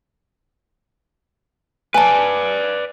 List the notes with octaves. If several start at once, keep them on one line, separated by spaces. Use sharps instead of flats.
B4 D5 G#5 A5